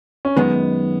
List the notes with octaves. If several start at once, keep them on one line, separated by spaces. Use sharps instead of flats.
C#4
F#2 D#3 G#3 B3